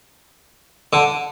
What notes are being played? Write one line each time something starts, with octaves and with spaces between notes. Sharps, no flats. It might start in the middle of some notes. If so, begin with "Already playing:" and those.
D3